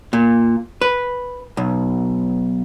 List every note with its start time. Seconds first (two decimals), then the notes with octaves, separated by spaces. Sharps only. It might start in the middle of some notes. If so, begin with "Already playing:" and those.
0.13 A#2
0.81 B4
1.57 B1